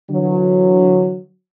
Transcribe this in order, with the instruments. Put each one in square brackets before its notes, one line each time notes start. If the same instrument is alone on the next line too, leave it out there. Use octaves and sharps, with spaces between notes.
[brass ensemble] D3 E3 F#3